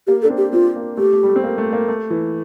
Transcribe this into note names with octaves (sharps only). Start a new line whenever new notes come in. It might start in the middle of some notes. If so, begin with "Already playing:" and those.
A#3 G4
D4 A4
C4
G4
C4 F4
A#3
A3 G4
A3
G3
A3
C4
A#3
A3
A#3
A3
E3